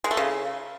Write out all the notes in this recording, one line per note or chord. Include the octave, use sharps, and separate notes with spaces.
G#3
A3
C#3